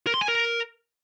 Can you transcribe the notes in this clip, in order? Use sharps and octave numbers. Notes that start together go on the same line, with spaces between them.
A#4
C6
G#5
A#4